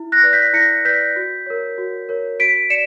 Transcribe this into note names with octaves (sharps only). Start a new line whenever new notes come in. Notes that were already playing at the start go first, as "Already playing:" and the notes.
Already playing: E4
F#6 A#6
B4 D5
G6 B6
E4 A#6 C#7
B4 D5 G6 B6
F#4
A#4 C#5
F#4
A#4 C#5
F#4 B6 D7
D5 C#7 E7